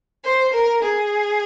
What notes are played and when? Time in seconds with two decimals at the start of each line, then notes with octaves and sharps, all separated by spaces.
0.23 C5
0.53 A#4
0.82 G#4